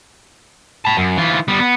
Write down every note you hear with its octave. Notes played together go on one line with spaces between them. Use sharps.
A5 B5
F#2
E3 F4
G3 B3
B3